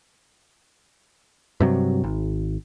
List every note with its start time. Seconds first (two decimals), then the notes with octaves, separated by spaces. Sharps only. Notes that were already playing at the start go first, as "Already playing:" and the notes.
1.60 G2 C3 F#3
2.04 G#1